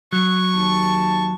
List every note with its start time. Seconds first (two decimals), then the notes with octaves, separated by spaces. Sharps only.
0.13 F#3 C#6
0.54 D#2 A5